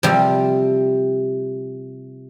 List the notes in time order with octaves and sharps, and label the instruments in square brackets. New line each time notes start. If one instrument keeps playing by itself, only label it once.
[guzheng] C3 F3 G3